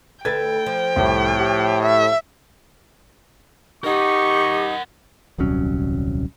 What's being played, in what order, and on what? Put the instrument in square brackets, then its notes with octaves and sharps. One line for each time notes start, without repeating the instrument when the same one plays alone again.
[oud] D2 A4 B4 [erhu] G5 [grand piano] G#6 A6
[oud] F3
[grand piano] C2 G4 [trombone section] A2
[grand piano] G4
[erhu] E5
[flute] D#4 [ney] G4 [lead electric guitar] A#4 F#5 [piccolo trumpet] C#6
[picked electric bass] D#1 C2 F#3 C#4